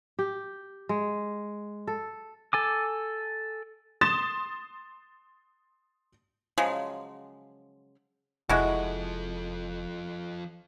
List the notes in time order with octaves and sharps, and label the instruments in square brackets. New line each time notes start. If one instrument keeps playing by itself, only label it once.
[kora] G4
G#3
A4
[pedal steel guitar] A4 G#5 D6
[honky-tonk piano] C6 D#6 A6 E7
[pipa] C#3 F3 F#3 G#3
[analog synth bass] F1 [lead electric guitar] F3 A4 [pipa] G#3 E4 F#4